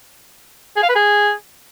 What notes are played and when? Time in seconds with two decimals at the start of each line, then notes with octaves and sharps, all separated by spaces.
0.77 G#4
0.83 F5
0.89 B4
0.95 G#4